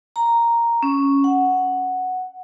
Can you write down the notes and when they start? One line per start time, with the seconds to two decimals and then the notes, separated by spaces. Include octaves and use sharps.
0.16 A#5
0.83 C#4
1.24 F#5